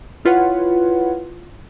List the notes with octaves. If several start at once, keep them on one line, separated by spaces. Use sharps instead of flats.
E4 F4 B4 C#5 F#5